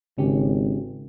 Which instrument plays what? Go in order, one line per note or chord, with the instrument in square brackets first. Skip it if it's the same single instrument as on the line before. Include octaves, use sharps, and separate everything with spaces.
[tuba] G#1 [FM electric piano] C#3 C#4 G4